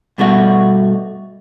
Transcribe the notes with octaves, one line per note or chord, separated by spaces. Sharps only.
G2 B2 A3 F#4